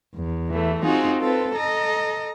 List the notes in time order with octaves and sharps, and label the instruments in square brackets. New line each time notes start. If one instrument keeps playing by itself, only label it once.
[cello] E2
[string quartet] E3 A3
[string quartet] C4 F#4 G#4 [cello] D#4 F4
[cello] C4 F4 [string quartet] A4 B4
[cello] A4 D#5 [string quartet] A#5